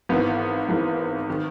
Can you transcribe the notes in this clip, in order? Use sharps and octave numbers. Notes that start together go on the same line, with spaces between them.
G#1 G#2 E3 B3
G#1 G#2 E3
D#3